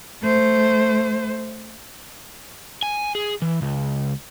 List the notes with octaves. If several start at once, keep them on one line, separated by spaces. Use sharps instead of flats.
A3 C5
G#5
G#4
E3
C#2